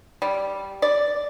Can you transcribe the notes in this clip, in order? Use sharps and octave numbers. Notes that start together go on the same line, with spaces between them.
G3
D5